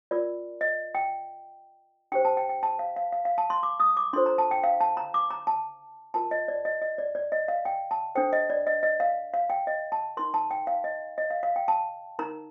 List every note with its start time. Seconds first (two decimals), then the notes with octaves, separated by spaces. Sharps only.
0.11 F4 A#4 D5
0.61 D#5
0.95 G5
2.12 D4 G4 C5 G5
2.25 A5
2.37 G5
2.49 G5
2.63 A5
2.79 F5
2.96 F5
3.12 F5
3.25 F5
3.38 A5
3.50 C6
3.63 D6
3.80 D#6
3.97 D6
4.13 D4 F4 A4 C5 C6
4.26 A#5
4.38 A5
4.51 G5
4.64 F5
4.81 A5
4.97 A#5
5.14 D6
5.30 A#5
5.47 A5
6.14 F4 A#4 A5
6.31 D#5
6.48 D5
6.65 D#5
6.82 D#5
6.98 D5
7.15 D5
7.32 D#5
7.48 F5
7.65 G5
7.91 A5
8.15 D4 A4 C5 G5
8.33 D#5
8.50 D5
8.67 D#5
8.83 D#5
9.00 F5
9.34 F5
9.50 G5
9.67 D#5
9.92 A5
10.17 D#4 A#4 C6
10.34 A5
10.51 G5
10.67 F5
10.84 D#5
11.18 D#5
11.31 F5
11.43 F5
11.56 G5
11.68 A5
12.19 D#4 A#4 A#5